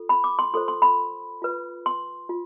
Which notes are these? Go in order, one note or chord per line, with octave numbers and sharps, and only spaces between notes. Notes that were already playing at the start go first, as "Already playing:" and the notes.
Already playing: F4 A4
B5
D6
C6
F4 A4 C5 C6
C6
B5
F4 B4
C6
F4